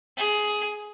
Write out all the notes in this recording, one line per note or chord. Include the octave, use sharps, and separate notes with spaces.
G#4